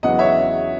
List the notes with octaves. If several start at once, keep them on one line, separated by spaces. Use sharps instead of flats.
E2 C#3 F#3 B3 D#5 F#5
C#5 E5